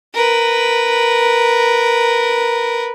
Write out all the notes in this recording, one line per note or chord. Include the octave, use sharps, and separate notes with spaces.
A#4 B4